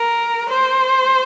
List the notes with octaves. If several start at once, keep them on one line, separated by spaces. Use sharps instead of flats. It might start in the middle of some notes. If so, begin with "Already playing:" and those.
Already playing: A#4
C5